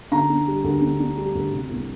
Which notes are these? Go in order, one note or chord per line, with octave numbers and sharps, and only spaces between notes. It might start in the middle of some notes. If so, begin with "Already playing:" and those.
D3 A#5
D4
G3
D2
D3
D4
G3
D2
C3
C2